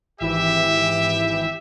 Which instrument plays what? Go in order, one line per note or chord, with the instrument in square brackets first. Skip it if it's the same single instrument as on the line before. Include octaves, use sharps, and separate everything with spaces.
[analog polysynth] G#1 E3 [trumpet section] G4 E5